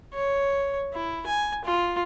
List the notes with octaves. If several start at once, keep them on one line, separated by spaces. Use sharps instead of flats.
C#5
E4
G#5
F4